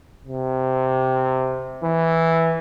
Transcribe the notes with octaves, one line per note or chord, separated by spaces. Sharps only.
C3
E3